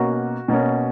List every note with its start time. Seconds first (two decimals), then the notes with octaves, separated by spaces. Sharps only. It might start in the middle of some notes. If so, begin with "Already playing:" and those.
Already playing: B2 A#3 C#4 F#4
0.48 B2 A#3 C#4